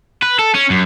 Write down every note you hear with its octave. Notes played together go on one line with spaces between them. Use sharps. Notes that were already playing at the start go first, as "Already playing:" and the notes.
B4
A4
C#4
F#2